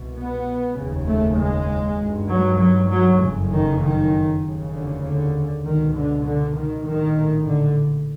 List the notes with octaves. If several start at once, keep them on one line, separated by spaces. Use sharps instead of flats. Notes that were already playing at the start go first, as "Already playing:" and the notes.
Already playing: C2 B2
B3
F1 D#2 C#3
A3
G#3
G#1 G2
F#3
F#3
F#3
F#1 F2 C#3
D#3
D#3
F1 D#2 C#3
D3
D3
C#2 B2 D#3
D3
D3
D#3
A#1 A2 D#3
D3